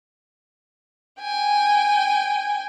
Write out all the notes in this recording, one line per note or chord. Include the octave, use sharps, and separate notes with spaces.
G5 G#5